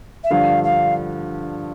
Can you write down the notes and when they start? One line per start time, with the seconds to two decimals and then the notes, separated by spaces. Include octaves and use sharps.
0.23 E5
0.30 G2 D3 F3 F5
0.63 F5